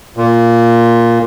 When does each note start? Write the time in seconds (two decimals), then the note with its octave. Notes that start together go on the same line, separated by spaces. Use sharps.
0.17 A#2